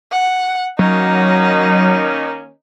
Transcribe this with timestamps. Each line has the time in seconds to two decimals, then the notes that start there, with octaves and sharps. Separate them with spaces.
0.12 F#5
0.79 D#3 F#3 A#3 C#4 D#4